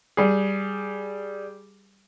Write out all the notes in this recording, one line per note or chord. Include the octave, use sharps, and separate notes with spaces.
G3 G#4